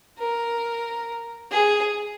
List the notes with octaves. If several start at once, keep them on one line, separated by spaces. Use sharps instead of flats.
A#4
G#4